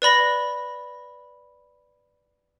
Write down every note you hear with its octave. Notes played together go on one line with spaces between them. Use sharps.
B4 D5 B5 A#6